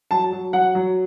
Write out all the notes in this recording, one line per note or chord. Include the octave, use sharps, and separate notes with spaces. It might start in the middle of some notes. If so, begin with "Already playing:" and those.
F#3 A5
F#3
F#3 F#5
F#3